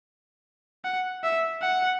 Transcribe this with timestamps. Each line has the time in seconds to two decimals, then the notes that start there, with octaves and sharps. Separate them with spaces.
0.84 F#5
1.24 E5
1.62 F#5